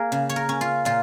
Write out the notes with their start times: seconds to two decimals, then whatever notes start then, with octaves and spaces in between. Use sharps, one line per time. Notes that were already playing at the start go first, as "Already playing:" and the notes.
Already playing: A#3 G#4 A#4
0.12 C#3
0.29 C#5
0.36 A#4
0.49 C#4
0.61 F4
0.85 A#2 F4